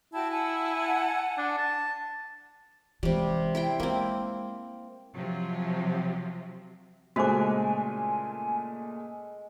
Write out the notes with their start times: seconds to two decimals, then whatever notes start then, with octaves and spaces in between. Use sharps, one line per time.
0.13 E4 F#4 G5 A5
0.31 F#5 G#5 A5
1.38 D4
1.57 A5
3.03 C3 E3 G3 G#3
3.55 E4 C5 G5
3.80 G#3 A#3 C4
5.15 C3 F3 F#3
7.16 A#2 C#3 G#3 A3 F#4 C5 G#5 D6